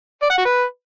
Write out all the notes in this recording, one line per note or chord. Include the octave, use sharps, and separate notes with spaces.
D5
F#5
F#4
B4